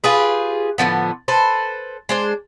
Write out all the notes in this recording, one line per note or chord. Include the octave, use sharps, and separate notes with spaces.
F4 G4 G#4 B4
A2 D3 F3 B3
A4 B4 C5
G#3 D4 C5